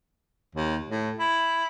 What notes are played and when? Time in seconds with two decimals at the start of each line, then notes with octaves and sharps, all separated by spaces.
0.55 D#2
0.90 A2
1.19 E4